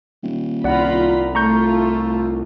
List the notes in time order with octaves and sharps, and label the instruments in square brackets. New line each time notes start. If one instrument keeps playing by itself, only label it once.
[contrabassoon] D#1
[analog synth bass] C2 [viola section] F4 A#5 B5 [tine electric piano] D5 F#5
[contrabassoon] A2 [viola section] A3 F4 [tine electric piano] A#5 C#6 G6